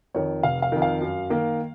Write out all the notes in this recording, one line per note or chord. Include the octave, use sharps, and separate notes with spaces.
F2 D#3 C#5
F1 F5
F5
F2 D#3
F5
F#2
D#3 A#3